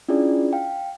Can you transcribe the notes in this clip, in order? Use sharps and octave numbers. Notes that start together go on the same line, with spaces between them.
C#4 D4 E4 F4 G#4 D5
F5 G5